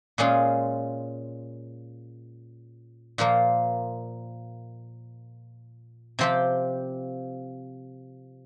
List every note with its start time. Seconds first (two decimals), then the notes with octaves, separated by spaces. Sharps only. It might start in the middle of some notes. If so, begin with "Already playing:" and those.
0.18 A#2 G#3 C#4 F4 G#4
3.18 A#2 F3 A#3 F4
6.19 C3 F3 C4 G4